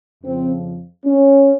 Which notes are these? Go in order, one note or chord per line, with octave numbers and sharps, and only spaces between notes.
F2 C#3 F3 C4
C#4